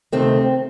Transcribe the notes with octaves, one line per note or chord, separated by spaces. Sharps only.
D2 C3 D#3 A3 C4